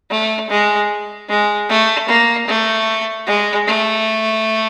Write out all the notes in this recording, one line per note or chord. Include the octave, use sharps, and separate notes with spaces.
A3
G#3
G#3
A3
A#3
A3
G#3
A3